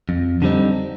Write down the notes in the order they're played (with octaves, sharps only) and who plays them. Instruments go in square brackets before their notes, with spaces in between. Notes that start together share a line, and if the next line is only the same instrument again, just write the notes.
[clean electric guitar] F2
D3 G3 C4 D#4